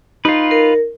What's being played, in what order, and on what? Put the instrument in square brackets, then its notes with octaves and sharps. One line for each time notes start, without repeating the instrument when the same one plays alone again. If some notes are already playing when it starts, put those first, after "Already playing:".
[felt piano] D#4 [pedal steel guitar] F4 B4
[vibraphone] A#4